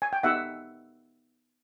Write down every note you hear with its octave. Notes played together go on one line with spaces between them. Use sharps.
G#5
G5
B3 D#4 G4 E5 F#5